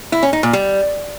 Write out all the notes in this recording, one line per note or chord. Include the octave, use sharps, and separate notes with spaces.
E4
C#4
D#4
A#2
G3